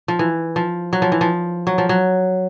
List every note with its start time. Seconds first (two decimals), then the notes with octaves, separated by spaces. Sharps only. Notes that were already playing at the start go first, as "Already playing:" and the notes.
0.08 F3
0.19 E3
0.56 F3
0.93 F#3
1.02 F3
1.12 E3
1.21 F3
1.67 F#3
1.78 F3
1.89 F#3